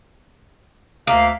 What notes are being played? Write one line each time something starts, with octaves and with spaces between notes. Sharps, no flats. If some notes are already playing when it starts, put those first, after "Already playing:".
D2 A#3 E5 F5